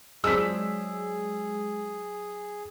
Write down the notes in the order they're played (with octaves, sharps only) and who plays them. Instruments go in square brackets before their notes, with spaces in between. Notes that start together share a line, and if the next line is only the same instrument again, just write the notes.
[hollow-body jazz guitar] F#3 C4 D4 [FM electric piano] G#3 [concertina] G#4 [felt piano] E6 B6